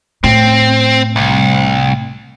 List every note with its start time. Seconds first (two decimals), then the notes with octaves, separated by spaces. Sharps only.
0.24 A2 C4
1.16 C2